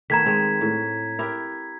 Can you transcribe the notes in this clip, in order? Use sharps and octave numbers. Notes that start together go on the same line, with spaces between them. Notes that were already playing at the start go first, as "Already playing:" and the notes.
D#3 A3 B3 A#5 G#6 B6
G#3 C4
A2
E4 G4 A#4